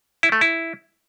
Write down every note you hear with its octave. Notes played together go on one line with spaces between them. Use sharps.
E4
A3
E4